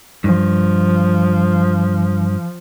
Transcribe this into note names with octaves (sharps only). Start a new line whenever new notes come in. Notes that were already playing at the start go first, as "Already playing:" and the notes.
G2 F3